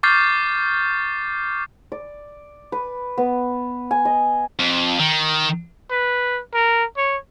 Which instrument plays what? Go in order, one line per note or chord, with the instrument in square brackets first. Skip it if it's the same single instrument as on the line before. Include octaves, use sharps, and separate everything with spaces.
[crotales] C#6 D6 F6 G6 A6 C7
[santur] D5
B4
B3
G#5
D#5
[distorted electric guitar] F2
D#3
[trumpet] B4
A#4
C#5